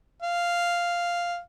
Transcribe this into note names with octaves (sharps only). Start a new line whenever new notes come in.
F5